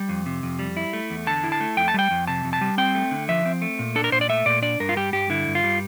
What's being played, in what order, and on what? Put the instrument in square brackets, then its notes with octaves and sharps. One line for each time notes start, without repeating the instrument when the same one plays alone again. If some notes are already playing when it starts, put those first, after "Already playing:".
Already playing: [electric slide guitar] G3
F2
C3
F2
G3
E4
A3
E2
D3 A5
E4
A5
A3
F2 G5
A5
G3 G5
F2
C3 A5
F2
A5
G3
C4 G5
A3
D3
F3 E5
C4
A3
A#2
D4 A4
A#4
A#2 C5
D5
A3 E5
A#2 D5
D4 D5
G2 A#4
F4
G3 G4
G2 G4
D3 E4
G2
F4
G3